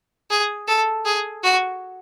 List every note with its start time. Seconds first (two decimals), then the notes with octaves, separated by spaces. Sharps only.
0.30 G#4
0.68 A4
1.05 G#4
1.43 F#4